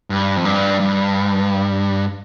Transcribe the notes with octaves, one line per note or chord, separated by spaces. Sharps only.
G2
F2
G2
G2